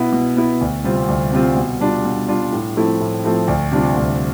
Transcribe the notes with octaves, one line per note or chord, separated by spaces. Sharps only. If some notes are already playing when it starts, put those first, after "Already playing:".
Already playing: B2 B3 E4
B2
B3 E4
D2
C3 G3 C4 F4
D2
C3 G3 C4 F4
B2
G3 D4 F4
B2
G3 D4 F4
A2
F3 A3 C4 E4
A2
F3 A3 C4 E4
D2
C3 G3 D4 F4
D2